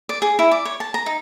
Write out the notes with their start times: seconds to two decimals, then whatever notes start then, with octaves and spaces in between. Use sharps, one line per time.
0.09 D5
0.22 G#4
0.39 E4
0.51 D5
0.65 C#5
0.80 A5
0.94 A#5
1.06 D#4